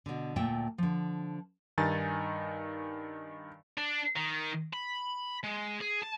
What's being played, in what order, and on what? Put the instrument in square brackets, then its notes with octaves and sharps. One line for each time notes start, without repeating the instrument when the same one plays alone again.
[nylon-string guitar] B2 D3
D2 A#2 A3 E5 G5
D3 F3
[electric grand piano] G2 D#3 D#4 G#5 A6
[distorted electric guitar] D4
D#3
B5
G#3
G#4
A5